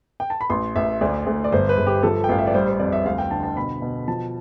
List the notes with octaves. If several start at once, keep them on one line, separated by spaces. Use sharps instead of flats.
G5
A5
B5
A1 C6
A1 E5
D2 D5
D2
D5
G1 C5
B4
G1
G4
F3 A4
G5
A1 F5
E5
D5
G3 C5
C5
F2 D5
E5
D2 F5
G5
D3 A5
A5
B2 B5
B2
F3 A5